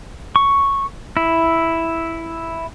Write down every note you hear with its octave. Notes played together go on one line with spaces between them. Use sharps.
C#6
E4